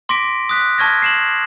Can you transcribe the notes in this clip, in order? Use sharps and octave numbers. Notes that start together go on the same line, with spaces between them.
C6 D6 A#6 B6 D7
D#6 F#6 B6
A5 C#6 F6 G#6 A#6
C7 E7 F#7